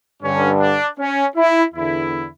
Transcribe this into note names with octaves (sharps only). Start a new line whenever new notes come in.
G2 D3 C#4
D4
C#4
E4
E2 D3 E4